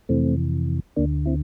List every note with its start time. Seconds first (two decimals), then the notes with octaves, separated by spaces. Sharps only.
0.09 F2 C3 E3 A3 C4
0.97 D2 D3 A#3 D4
1.26 C4 E4